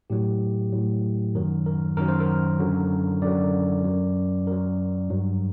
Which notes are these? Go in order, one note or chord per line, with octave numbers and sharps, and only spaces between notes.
A2 F#3 G4
A2 F#3
F#2 D#3 F#3 A#4
A#4
F#2 D#3 F#3 A#4
C5
A#4
F#2 D3 F#3
F#2 D3 F#3 D5
F#2 F#3
F#2 F#3 A#4
G2 F#3